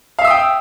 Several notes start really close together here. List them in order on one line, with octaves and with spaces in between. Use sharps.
F5 E5 E6 D#6 G5